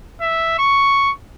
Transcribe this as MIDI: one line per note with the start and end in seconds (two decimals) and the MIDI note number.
0.21 0.59 76
0.59 1.11 85